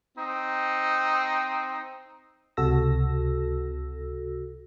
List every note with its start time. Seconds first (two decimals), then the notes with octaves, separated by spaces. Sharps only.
0.18 C4 D#4
2.57 C#2 C3 F#4 A4 E6 A#6